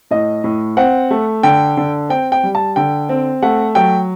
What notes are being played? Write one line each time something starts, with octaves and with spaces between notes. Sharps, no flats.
A2 D#5
A2
C4 F#5
A3
D3 G5
D3
C4 G5
G5
G3
A5
D3 G5
C4
A3 F#5
F#3 G5